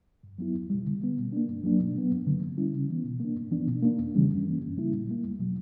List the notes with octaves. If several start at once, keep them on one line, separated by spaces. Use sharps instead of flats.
G2
F#3 B3 E4
E2
B2 G3
D3
G3 B3
B2
A#3 D4
G2
F#3 A#3 D4
B2
F#3 B3
G2
D3 F#3 A#3
D3
G3 C#4 E4
C#3
E3 B3
B2
A#3 D4
G2
E3 B3 D4
B2
A#3 D4
E2
C#3 E3 G3 C#4
G2
E3 A#3 C#4
F#2
C#3 G3 A#3 E4
A#2
G3 A#3
E2
B2 F#3